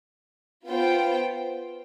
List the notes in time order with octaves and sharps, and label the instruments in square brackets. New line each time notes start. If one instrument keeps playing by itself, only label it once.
[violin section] B3 F4 C5 G5